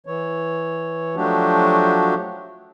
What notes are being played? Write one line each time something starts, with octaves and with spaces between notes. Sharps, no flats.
E3 C#5
F3 F#3 A3 D4 F#4 G4